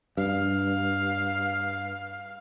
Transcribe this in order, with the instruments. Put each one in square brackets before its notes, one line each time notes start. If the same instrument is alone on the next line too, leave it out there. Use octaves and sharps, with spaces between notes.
[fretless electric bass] G2 [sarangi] F5